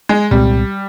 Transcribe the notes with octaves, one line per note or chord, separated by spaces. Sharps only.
G#3
C2 A#2 G3 G#3 C4